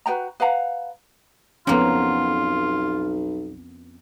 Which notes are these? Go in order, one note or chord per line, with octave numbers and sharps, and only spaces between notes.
F#4 B4 G5 A#5
B4 F5 F#5 A#5
B1 F2 A#3 B3 C#4 F4